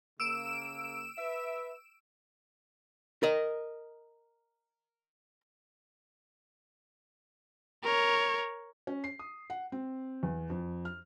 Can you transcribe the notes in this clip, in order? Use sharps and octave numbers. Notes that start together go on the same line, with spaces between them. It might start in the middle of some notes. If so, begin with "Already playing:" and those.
C#3 A#3 E6 D7 E7
B4 E5
A#4 D#5
A#4 C#5
C#4
C7
D#6
F#5
C4
E2
F2
F6